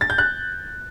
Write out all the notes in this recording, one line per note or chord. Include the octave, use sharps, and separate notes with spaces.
A6
G6
F#6